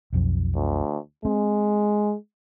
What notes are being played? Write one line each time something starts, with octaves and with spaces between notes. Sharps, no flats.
B1 F2
D2
G#3 C4